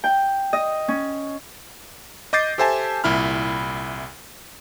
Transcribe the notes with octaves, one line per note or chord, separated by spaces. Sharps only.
G5
D#5
C#4
D#5 D6 G6 A6 C7
G4 A4 C5 E5 G#5 A5
C2 A#2 E4 B5 F6